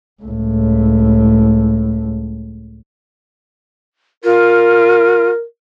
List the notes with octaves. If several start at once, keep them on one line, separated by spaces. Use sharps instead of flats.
C#2 A2
F4 A#4